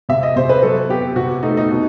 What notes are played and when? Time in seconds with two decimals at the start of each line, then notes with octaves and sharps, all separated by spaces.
0.09 C3 E5
0.23 D#5
0.36 C3 C5
0.49 B4
0.63 F#3 A4
0.89 B3 G4
1.16 C3 F#4
1.43 A3 D#4
1.57 D#4
1.71 B2